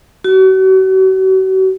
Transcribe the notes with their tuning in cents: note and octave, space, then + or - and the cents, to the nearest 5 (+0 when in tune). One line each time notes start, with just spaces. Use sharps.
F#4 +40